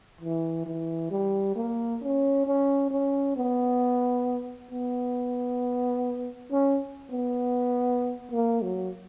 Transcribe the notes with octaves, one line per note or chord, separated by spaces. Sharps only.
E3
E3
G3
A#3
C#4
C#4
C#4
B3
B3
C#4
B3
A#3
F#3